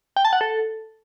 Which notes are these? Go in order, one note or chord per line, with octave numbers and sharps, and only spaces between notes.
G5
A5
F#5
A4